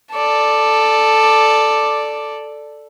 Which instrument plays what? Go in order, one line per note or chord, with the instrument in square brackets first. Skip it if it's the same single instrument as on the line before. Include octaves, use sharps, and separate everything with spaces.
[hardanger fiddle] A4 D5